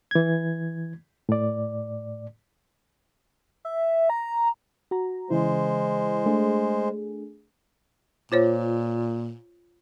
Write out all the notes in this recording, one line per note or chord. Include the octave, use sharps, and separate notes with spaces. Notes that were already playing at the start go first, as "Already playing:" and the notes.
E3 G#6
A2 D5
E5
A#5
F#4 A#5
C#3 E3 G#3 E4 C5
A3 D4 G#4
A#2 F4 C5 C#5